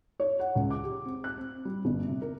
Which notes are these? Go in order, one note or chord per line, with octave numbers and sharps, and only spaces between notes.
C#5
F#5
C#2
D6
G4
C4
F#6
C4
G3
G1
C3
A#4